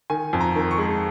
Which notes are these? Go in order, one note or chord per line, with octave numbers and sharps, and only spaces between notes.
D#3 G#5
F2
A#5
D#3
C#6
G#3